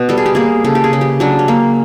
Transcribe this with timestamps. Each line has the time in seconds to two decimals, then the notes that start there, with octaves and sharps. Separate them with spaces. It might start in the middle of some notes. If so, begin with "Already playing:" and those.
Already playing: B2
0.09 G3 A4
0.17 G#4
0.26 G4
0.35 A#3 G#4
0.64 C#3 A4
0.75 G4
0.84 G#4
0.93 C#3
1.01 G4
1.20 F#3 D4
1.39 C#4
1.48 A#3